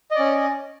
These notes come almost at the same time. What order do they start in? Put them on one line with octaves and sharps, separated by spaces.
D#5 D5 C#4